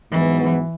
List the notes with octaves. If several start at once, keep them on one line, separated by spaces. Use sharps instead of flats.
G#2 E3 F#3 B3